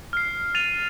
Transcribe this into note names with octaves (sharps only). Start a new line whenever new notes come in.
F6 C7
A6 D#7 F7